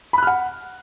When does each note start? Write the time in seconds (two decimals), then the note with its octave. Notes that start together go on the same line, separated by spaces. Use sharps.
0.13 B5
0.18 F#6
0.23 F6
0.27 F#5